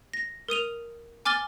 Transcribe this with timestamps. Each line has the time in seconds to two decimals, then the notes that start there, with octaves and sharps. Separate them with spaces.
0.14 A#6
0.48 A#4 D#6 D#7 F7
1.25 G#5 D6 F6 A6 G7